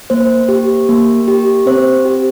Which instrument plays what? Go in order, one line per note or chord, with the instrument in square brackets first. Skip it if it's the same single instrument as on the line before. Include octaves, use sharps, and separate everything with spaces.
[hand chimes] A#3 C5
G4
A#3
G4
C4 C5
G4